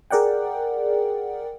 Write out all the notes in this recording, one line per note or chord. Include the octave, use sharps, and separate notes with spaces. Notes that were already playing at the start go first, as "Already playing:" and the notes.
G#4 A#4 D5 F#5 G5